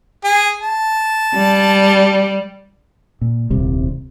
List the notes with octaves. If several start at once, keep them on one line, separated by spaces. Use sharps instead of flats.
G#4
A5
G3
A#2
D#1 C2 C3 G3